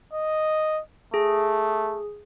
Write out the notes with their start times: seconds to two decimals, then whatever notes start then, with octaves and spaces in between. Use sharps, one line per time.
0.13 D#5
1.14 A3 G#4